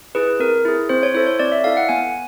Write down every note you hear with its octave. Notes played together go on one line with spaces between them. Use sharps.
E4 G#4 B4
C4 A#4
E4 G#4
C4 C5
C#5
E4 A4 C5
C#5
C4 D5
E5
E4 A4 F5
F#5
B3 G#5